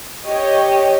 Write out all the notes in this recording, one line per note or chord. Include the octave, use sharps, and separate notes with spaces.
G4 C#5 D#5